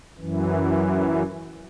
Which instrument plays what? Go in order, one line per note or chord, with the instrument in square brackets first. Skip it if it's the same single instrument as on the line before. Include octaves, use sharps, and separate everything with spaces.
[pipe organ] F#2 E3